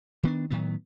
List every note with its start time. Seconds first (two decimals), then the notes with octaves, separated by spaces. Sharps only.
0.23 D#3 B3 D4
0.50 A2 D#3 F#3 B3